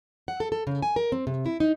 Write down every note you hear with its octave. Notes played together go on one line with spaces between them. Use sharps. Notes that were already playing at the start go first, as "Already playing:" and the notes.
F#5
A4
A4
C#3
G#5
A#4
C4
C3
E4
D#4